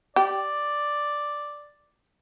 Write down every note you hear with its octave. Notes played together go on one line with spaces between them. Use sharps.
G4 D5